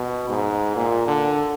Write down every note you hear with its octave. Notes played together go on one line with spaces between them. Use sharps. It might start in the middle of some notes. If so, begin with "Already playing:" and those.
Already playing: B2
G#2
A#2
D3